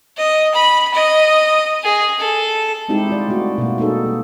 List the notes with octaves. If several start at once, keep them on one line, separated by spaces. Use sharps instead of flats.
D#5
B5
D#5
G#4
A4
G3 G#3 C4 D#4 E4 G4
F4 D5
G3 A3 A#3 F#4
B2 A#3
A#3 D#4 G#4 A4
G3